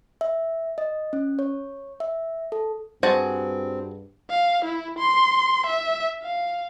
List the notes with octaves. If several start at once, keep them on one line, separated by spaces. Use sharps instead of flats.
E5
D#5
C#4
C#5
E5
A4
G2 C4 F#4 G#4 C5 A5
F5
E4
C6
E5
F5